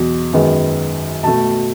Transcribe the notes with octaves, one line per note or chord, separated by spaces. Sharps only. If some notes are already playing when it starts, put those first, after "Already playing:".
Already playing: E2 B2 F#3
F#2 D#3 G#3 B3
B2 A3 A5